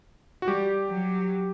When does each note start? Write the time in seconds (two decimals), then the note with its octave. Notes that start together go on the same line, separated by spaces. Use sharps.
0.42 F#4
0.47 G3 G4
0.88 F#3